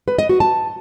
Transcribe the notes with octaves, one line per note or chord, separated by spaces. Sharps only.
B4
D#5
F#4
A5